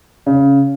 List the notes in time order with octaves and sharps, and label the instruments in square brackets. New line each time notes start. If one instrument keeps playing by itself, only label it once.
[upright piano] C#3